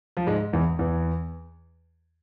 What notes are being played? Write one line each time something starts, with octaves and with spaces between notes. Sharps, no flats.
F3
G#2 G#3
E2 E3
E2 E3